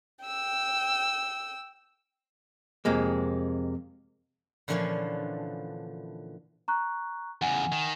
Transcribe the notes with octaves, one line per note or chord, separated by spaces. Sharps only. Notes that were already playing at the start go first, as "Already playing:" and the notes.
G5 E6
F2 C3 G#3 A#3
A#2 D3 E3 F3 C#4 D4
A#5 C#6 F#6
E2 C#3 F#5 G#5
D#3